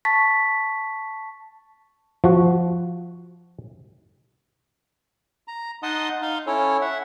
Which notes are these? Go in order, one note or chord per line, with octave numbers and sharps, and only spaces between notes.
A5 C#6 A6 B6
F3 F#4
A#5
D#4 D#5 F#5 A5 C6 D#6
D#4 F5 C6
C#4 E4 A4 C#5
E5 F#5